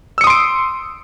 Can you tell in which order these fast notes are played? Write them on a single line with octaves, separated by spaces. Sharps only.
E6 C#7 D#6 C6 D7